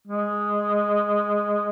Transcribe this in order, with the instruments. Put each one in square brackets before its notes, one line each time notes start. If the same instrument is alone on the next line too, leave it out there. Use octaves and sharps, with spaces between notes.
[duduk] G#3